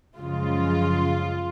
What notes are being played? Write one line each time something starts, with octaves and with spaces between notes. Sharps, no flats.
F#2 C#3 F3 G#3 F4